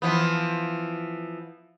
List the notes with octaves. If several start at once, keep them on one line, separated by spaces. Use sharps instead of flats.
E3 F3 B3